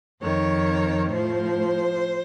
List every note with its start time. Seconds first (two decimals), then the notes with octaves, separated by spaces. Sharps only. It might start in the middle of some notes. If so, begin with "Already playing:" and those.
0.21 F2 D#3 C#5
1.10 A2 F3 C5